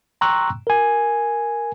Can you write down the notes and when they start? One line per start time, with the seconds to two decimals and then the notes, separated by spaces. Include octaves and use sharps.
0.21 G5 A#5 C6 C#6 E6 F#6
0.67 A#4 G#5